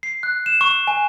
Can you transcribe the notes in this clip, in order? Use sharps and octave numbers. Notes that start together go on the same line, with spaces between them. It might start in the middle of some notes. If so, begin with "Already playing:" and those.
C7
F#6
E7
C#6
G#5